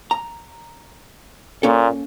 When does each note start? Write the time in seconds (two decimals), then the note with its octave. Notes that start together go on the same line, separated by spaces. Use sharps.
0.11 A#5
1.63 A#2 A#3 C#4 A4